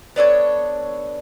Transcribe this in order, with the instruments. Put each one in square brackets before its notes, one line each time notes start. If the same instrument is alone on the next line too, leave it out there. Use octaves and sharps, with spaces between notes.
[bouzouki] B3 D4 A4 C#5